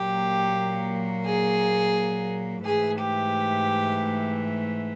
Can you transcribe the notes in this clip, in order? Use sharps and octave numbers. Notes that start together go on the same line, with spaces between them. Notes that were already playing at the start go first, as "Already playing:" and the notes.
Already playing: A#2 F#3 A#3 G4
G#4
G#2 E3 A3 G#4
G4